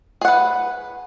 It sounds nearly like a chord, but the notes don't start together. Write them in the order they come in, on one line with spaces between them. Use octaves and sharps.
G#4 F#5 B4